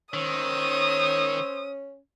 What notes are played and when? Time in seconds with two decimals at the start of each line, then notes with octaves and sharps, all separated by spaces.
0.14 D#3 C#4 C5 C#5 D#6 E6